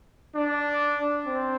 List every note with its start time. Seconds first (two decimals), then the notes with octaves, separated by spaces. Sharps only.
0.34 D4
1.26 C4